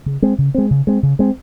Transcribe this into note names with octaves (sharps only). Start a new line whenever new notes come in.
C#3
G#3 C4
C#3
G#3 C4
C#3
G#3 C4
C#3
G#3 C4